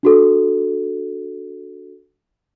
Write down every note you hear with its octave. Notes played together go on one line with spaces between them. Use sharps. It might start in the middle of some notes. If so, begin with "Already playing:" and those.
D4 F#4 A4